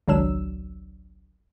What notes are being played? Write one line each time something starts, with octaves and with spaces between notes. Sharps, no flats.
G#1 C#2 F#3 D4 E6 E7